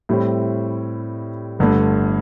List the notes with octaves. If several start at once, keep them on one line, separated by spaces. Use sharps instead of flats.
A2 G3 C4 E4
G1 G2 D3 A3